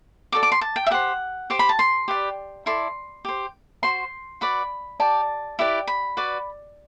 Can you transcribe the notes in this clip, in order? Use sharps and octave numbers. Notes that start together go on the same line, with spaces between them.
F#4 A4 D5 D6
D6
C6
A5
G5
E5
G4 C5 F#5
G4 C5 D6
B5
A5
C6
G4 B4 D5
E4 A4 D5 C6
G4 C5
F#4 C5 C6
F#4 B4 D5 B5
G4 D5 A5
E4 G4 B4 D5
B5
F#4 B4 D5